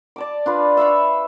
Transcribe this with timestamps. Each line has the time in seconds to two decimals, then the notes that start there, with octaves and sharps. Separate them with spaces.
0.16 D5 A5 D6
0.46 D4 F4 B4
0.77 E5 F5 B5 C#6